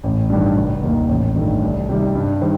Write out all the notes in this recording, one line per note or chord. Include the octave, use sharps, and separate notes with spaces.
A1
G2 D#3 G3
F1
D#2 D#3 A#3
A1
G2 D#3 A3
C2
C3 D#3 G3
G2
D#3 G3 C4